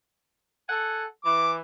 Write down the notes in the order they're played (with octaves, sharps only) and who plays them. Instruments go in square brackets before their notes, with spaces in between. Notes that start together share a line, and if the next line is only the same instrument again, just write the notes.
[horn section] A4 F#5 G#5
[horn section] E3 [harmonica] D6